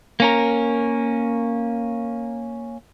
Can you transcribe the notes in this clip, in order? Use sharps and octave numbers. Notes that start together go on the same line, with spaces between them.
A#3 C#4 A#4